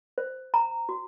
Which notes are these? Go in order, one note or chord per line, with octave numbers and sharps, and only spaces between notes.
C5
A#5
F#4